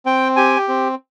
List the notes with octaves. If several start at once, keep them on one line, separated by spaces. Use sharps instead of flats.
C4 G5
G4 G#5
C4